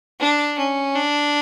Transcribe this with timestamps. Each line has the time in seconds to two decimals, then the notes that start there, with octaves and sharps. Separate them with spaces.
0.20 D4
0.58 C#4
0.95 D4